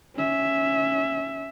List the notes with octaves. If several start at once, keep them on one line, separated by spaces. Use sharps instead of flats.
C#4 E5